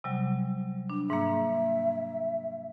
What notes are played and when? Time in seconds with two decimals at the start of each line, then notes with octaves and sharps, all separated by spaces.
0.04 C3 F#3 G3
0.90 D4
1.10 G#2 A#3 E5